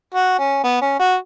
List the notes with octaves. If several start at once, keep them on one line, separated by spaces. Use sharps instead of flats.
F#4
C#4
B3
C#4
F#4